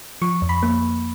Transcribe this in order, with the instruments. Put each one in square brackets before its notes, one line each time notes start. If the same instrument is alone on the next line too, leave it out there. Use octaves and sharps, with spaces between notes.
[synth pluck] F3 C#6
F2
B5
A#3